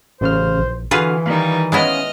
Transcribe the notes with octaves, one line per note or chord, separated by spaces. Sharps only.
A1 C#3 C5 F6
A#1
D3 E3 F4 F#4 G#4 B4 F6
D#3 G3 D#4 F5
G#3 B3 C#4 E4 C#5 D#5 F5 F6